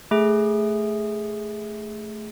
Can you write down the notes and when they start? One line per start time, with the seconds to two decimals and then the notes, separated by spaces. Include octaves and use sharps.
0.11 A3 G#4